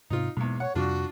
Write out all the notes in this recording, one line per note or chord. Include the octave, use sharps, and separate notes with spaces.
G#2 C3 C4 D#4 F4
E2 G#2 B2 A#3
C#5 F#5
F2 C3 G3 D4 F4 F#4